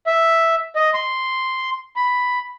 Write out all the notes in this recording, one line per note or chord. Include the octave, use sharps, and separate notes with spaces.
E5
D#5
C6
B5